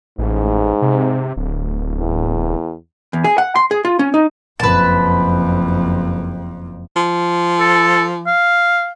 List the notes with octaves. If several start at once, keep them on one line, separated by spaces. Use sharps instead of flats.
A1 G#2
C3
D1
E2
E2
G#4
F#5
C6
G#4
F4
C#4
D#4
F#1 F2 B4 A5
F3
A4
F5